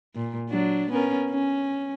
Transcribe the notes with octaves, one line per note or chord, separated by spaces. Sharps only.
A#2
F#3 D4
B3 C#4 A#4
C#4